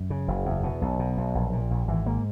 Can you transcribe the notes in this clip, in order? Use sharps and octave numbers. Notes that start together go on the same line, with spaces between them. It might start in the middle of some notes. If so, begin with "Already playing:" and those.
Already playing: F#2
C#3
F#1
E2
B2
B1
B2
B1
A#1
A#2
A#1
G#1 E3
G#2 A#3